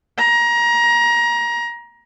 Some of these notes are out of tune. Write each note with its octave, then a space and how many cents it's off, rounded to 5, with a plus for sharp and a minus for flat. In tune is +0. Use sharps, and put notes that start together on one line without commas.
A#5 +25